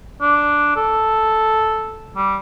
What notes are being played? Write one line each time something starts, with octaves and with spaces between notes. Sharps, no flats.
D4
A4
G3